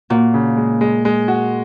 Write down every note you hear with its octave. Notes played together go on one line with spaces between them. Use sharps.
A#2 F#4
C#3
G#3
G#3
G#3
F#4